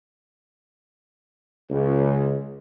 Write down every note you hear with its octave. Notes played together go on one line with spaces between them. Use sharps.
C#2